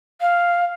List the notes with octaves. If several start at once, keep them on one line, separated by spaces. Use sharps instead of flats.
F5